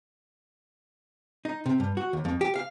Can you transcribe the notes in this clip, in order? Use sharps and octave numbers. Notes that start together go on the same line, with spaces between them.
D#4
C3
G2
F#4
D#2
F2
G4
F5